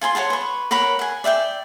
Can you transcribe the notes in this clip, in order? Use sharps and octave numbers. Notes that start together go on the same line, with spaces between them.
F4 G#5 A5 C6
C#5 F#5 A5 C6
B4 C#6
A#4 C#5 F#5 B5
F#5 G#5
D5 E5 F#5 G5